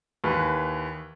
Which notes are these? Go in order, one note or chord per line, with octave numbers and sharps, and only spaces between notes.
D#2 E3 B4